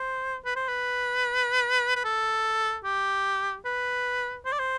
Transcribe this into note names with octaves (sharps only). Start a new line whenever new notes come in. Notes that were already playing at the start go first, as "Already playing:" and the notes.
Already playing: C5
B4
C5
B4
B4
A4
G4
B4
C5
D5
C5